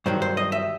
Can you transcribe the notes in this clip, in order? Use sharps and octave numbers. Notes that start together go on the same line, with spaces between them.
G2 D#3 F#3 C5
C5
D#5
E5